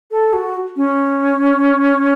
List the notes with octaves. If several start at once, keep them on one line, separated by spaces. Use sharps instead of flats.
A4
F#4
C#4